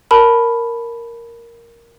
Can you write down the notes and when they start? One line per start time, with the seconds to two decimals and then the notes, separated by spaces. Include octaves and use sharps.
0.11 A#4 A5 B5